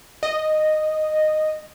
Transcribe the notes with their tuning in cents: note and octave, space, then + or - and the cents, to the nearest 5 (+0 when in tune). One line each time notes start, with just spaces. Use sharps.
D#5 -10